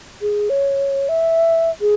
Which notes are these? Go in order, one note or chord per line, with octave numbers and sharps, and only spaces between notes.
G#4
C#5
E5
G#4